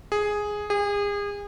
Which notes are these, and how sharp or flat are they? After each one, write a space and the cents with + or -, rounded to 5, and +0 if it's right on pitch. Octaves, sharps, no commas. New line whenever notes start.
G#4 +0
G#4 -35